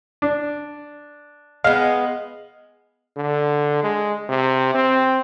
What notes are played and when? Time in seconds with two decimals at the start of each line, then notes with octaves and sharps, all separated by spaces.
0.22 D4
1.64 G#3 B3 F5
3.17 D3
3.83 G#3
4.29 C3
4.75 C4